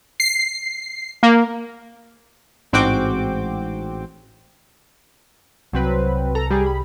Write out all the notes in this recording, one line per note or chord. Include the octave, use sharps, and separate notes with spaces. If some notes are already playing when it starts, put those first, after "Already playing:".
C7
A#3
A1 G#2 C4 F#4 G5 D6
C2 F#3 C4 B4
A4 A#5
G3 G4 G#4
B5